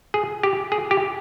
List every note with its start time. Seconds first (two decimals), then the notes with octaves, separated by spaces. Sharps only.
0.14 G#4
0.43 G4
0.72 G#4
0.91 G4